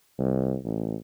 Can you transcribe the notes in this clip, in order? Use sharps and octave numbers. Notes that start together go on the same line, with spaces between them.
C2
A1